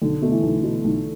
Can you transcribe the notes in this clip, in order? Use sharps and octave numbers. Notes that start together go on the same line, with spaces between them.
B1 D3
B2 A3 B3
E3
B1
B2 B3
B1